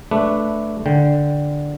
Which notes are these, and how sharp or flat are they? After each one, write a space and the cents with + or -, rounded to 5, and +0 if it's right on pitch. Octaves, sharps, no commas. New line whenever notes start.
A3 +0 D4 +0 B4 +5
D3 +0 G5 -5